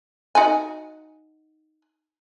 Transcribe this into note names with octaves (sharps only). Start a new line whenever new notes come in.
D#4 F#4 G#5